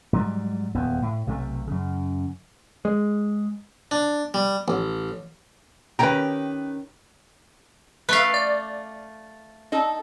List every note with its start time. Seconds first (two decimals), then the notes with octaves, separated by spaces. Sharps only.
0.13 G#2 F#3 G3
0.75 D#1 E2 B3
1.02 A2
1.27 B1 C3 F#3 A3
1.67 F#2 C#3
2.85 G#3
3.91 D4
4.34 G3
4.68 A1
5.99 D#3 C#4 G4 B4 A#5
8.09 A3 B4 E5 F5
8.34 D5
9.72 D#4 A4